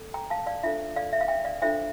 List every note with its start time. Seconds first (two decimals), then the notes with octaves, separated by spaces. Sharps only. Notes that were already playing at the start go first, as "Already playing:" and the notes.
Already playing: A4
0.14 G5 A#5
0.30 F5 A5
0.46 D5 F5
0.63 D4 F4 A4 C5 E5
0.96 D5 F5
1.13 E5
1.21 F5
1.28 E5 G5
1.45 D5 F5
1.62 D4 F4 A4 C5 E5 G5